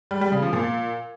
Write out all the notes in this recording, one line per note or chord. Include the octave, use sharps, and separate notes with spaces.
G3
G3
C#3
F3
A#2